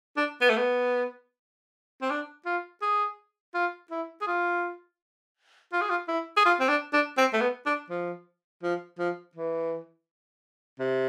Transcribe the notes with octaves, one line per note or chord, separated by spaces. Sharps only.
D4
B3
A3
B3
C4
D4
F4
G#4
F4
E4
G#4
F4
F4
G#4
F4
E4
G#4
F4
C4
D4
D4
C4
A3
B3
D4
F3
F3
F3
E3
C3